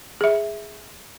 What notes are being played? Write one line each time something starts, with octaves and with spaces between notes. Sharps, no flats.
G#4 E5